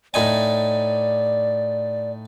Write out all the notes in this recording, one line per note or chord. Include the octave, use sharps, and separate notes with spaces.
A2 D#4 D5 G#5